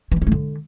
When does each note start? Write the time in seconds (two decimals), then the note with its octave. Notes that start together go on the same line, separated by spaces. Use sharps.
0.12 E3
0.17 A#3
0.22 C#4
0.27 A3
0.32 D3